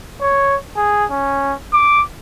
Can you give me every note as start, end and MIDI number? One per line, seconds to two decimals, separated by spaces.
0.21 0.56 73
0.76 1.05 68
1.10 1.54 61
1.73 2.01 86